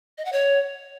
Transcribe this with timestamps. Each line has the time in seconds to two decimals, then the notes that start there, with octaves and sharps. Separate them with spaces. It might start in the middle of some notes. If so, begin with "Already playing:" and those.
0.18 D#5
0.25 F#5
0.33 C#5